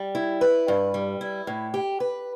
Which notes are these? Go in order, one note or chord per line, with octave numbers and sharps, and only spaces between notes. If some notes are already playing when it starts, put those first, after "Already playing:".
Already playing: G3
E4
B4
G2
G3
E4
A2
G4
B4